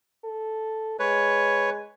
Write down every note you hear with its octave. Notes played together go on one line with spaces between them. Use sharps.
A4
G#3 B4 C#5